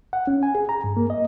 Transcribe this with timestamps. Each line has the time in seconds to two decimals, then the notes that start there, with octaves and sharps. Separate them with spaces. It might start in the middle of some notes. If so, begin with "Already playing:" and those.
0.13 F#5
0.27 C#4
0.43 G#5
0.55 G#4
0.69 A#5
0.84 G2
0.97 A#3
1.10 D#5